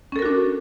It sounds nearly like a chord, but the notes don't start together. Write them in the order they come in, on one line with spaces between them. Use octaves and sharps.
C#4 A4 A#4 F#4 D4